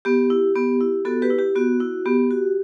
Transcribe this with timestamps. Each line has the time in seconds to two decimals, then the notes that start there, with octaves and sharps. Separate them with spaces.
0.05 B3 G4
0.30 E4
0.55 B3 G4
0.80 E4
1.05 B3 F#4 A4
1.22 G4 B4
1.30 E4
1.39 G4
1.56 B3 F#4
1.80 E4
2.06 B3 G4
2.31 F#4